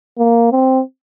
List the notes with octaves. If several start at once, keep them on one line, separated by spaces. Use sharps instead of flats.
A#3
C4